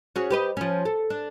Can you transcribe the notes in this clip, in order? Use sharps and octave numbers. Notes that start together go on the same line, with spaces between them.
C#4 F#4 G#4
G4 B4 D#5
F3 C#4
A4
D4